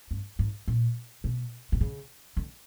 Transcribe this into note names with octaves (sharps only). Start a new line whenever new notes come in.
G2
G#2
A#2
B2
C3
C#3
D3